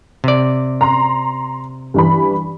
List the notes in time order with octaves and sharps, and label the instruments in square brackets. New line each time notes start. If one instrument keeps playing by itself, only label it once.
[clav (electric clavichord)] C3 D5
[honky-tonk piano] A#5 C6
G2 E3 B5